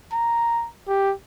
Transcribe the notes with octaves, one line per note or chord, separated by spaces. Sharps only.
A#5
G4